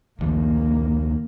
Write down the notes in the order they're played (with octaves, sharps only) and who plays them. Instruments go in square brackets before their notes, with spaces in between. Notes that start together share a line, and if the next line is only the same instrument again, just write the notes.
[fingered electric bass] D2 D#3 F3 [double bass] A#3